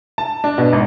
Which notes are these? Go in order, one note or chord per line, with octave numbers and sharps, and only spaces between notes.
A5
D4
B2
G#1